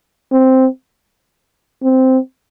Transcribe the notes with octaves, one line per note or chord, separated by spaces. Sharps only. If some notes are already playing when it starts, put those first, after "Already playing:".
C4
C4